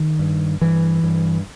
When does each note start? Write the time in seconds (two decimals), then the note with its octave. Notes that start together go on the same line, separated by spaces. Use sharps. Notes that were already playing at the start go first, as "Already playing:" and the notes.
Already playing: D#3
0.19 G2
0.61 G2 E3
1.04 G2